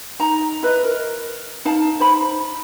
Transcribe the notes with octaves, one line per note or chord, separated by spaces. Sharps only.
D#4 A#5
E4 B4 D#5
A#4
D#4 F5 A5
D#4 C5 B5